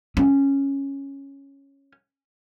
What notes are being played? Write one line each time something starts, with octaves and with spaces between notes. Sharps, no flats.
C#4